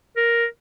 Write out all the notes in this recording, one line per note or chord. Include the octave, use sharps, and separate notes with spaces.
A#4